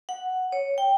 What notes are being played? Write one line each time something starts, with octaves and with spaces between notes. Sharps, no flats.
F#5
C#5
G5